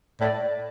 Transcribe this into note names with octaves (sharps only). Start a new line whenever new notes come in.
A2 D5